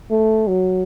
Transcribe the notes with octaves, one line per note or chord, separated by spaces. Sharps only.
A3
F#3